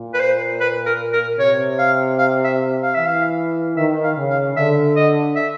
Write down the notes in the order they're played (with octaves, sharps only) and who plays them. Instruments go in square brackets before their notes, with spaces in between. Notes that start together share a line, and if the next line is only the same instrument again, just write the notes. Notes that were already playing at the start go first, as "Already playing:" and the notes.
Already playing: [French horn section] A#2
[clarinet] B4
C5
B4
A#4
A#4
[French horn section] C3 [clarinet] C#5
[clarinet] F5
F5
E5
F5
[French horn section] E3 [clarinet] E5
[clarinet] F5
[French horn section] D#3 [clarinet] E5
[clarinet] F5
[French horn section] C#3
[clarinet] F5
[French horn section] D3 [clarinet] E5
[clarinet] D#5
E5